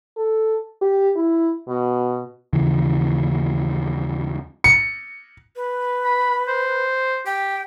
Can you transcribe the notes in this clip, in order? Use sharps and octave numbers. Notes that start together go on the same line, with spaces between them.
A4
G4
E4
B2
D#2 C#3 E3
C#7
B4
B5
C5
G4 G5